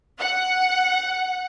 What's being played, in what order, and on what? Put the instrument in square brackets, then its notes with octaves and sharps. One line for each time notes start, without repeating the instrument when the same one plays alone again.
[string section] F#5